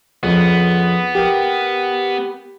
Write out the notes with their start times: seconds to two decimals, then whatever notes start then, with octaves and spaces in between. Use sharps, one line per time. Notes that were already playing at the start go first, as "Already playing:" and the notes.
0.23 F2 C#3 B3 D#6
1.15 G4 A#4 F5 G5